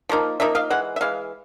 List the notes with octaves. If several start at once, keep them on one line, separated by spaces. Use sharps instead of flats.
F3 A#3 D#4
F3 A#3 D#4 E5
D#5 F5
E3 G#3 F#5
E5
E3 G#3 F5